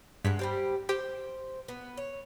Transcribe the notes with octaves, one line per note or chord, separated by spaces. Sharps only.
G2 G#3 F#5 B6
G3 C4 G4
G4 C5
B3
C#5